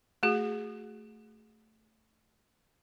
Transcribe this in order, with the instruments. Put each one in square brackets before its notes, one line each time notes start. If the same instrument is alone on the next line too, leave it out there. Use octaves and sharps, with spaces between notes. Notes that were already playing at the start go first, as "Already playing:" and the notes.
[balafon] A3 F#4 G#4